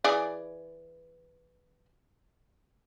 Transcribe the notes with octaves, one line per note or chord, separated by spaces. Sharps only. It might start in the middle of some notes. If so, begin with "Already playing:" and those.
E3 G#4 D5